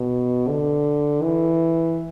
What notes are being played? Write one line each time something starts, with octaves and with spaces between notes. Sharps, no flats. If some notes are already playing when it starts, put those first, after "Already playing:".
Already playing: B2
D3
E3